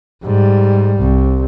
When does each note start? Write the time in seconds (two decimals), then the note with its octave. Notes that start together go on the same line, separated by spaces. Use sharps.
0.23 G#2 G3
0.99 C2